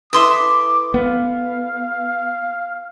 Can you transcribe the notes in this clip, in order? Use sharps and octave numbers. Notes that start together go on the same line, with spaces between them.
E4 A4 B4 E5 C6 D6 D#6
B3 F5